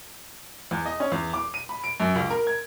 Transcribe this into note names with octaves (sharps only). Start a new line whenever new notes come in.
E2
D#5
C#4
E2
D6
D#7
B5
D7
F#2
C#2
A#4
G#6